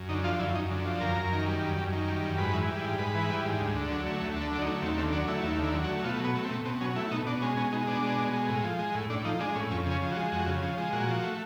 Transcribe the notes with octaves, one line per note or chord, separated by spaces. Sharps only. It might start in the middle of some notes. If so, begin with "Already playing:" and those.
Already playing: F#2
D3 D#4
F3 F4
F#2 E4
F#2 D#4
D3
F3
F#2 A#4
F#2
D#3
G3
F#2
F#2
D#3
G3
F#2
G#2 B4
E3
G3
G#2
G#2 B4
E3
G3
G#2
D2
D3
F#3
A3
D2
D3 A4
F#3 D4
D#4
A3
D#2 C4
D3 C4
F#3 D4
A3 E4
D#2 E4
D3 E4
F#3
F#4
A3
B2 F4
F#3 B3
A3
C4
B2
B2 C4
F#3 C#4
A3 E4
B2 D#4
B2 D4
G#3 C#4
B2 C#4
G#3 D#4
B2 D4
G#3
B2
G#3
A2
F3
G#3
A2
A2 D4
F3 D#4
G#3 D4
A2 C#4
F2 C#4
C#3 C#4
F3
F#4
G#3
F2 F#4
C#3
F3
G#3
A#2 F#4
F3
A3